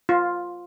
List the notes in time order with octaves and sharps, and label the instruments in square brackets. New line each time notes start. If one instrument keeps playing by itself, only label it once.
[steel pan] F4